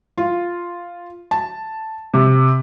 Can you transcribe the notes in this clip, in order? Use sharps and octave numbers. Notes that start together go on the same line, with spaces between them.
F4
A5
C3